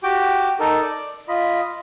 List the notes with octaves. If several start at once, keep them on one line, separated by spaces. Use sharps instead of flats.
F#4 G4 G5 D6
D#4 A4 A#4
D5
F4 D#5 B5